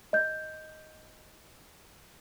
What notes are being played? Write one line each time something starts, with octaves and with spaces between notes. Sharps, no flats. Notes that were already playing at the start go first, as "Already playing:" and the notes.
D#5 G6